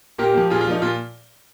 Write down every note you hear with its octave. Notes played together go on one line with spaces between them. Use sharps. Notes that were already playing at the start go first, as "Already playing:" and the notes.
A#2 G4 A#4
F3 A#3
A#2 F4 G#4
F4
F3 A#3 D#4
A#2 F4